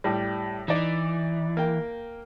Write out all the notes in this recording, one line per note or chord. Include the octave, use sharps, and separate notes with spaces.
A2 G3
E3 D#4 D5
A#3 G5